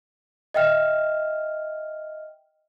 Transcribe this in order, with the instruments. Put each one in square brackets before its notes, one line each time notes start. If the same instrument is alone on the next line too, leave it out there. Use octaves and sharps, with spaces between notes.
[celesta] D#5 E5 G5 F6